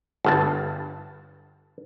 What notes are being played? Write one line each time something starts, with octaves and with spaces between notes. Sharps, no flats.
G1 G2 A5